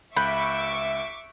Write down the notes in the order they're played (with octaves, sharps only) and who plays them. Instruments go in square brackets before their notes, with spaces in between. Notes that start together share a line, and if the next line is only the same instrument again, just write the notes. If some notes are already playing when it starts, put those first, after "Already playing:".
[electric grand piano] C#2 F#6 G6 [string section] E5 C#6 D6 [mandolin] B5